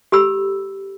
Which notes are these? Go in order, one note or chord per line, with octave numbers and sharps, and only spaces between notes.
G4 A4 B5 E6